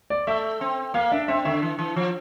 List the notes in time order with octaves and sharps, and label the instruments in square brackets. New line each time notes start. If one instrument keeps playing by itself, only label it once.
[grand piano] D5
[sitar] A3 [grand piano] E5
[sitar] C4
[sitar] A#3 [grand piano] F5
[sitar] D4 [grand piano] E5
[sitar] C4 [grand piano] E5
[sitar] D3 [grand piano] E5
[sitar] E3
E3
F3